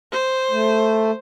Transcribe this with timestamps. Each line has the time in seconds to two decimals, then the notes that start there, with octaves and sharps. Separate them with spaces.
0.12 C5
0.51 A3